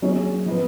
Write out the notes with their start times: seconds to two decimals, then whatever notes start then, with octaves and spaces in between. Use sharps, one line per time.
0.02 F#3 A#3 C#4 G#4 C#5
0.46 F3 B3 F4 B4